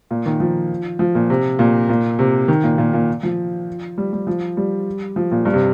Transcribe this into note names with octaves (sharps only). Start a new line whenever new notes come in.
A#2
D#3
F3
F3
A#2
C3
A#2
A#2
C3
D#3
A#2
A#2
A#2
F3
G3
G3
F3
G3
F3
A#2
G2
C3